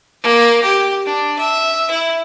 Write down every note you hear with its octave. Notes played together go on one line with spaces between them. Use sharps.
A#3
G4
D4
E5
E4